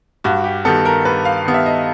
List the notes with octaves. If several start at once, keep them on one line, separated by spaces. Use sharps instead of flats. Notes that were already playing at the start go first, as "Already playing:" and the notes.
G2 F#4
G4
D#3 G3 B3 A4
A#4
G2 B4
F5
D#3 G3 B3
E5
D#5